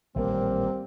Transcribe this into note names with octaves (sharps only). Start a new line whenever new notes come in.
A1 A#2 D#3 G3 A#3 C4